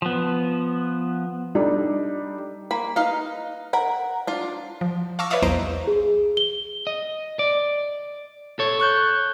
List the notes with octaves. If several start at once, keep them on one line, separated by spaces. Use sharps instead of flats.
F3 B3
G3 D4 D#4 A4
A#3 B5
D#4 B4 D#5 F5
A#4 F#5 B5
D4 F4
F3
F5 A5 C#6 D6 E6 A#6
B4 C#5 D5 E5 F5 D#6
B1 E2 C5 D#5 A#5 D7
G#4
G7
D#5
D5
A4 C#5
C#6 F#6 G6